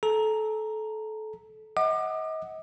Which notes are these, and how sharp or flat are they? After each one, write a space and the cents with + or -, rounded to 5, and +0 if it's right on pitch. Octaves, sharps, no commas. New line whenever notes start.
A4 -25 A#5 +0
D#5 +35 F#5 +0 D6 +35